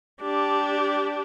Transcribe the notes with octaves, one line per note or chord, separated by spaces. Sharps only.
D4 G4